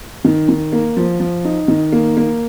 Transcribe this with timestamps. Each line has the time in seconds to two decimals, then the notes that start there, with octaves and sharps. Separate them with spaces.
0.25 D#3
0.49 D#3
0.72 A#3
0.97 F3
1.20 F3
1.45 D#4
1.68 D#3
1.92 A#3
2.17 A#3